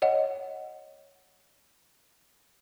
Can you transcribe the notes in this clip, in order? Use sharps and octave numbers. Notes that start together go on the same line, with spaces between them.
C#5 D#5 F#5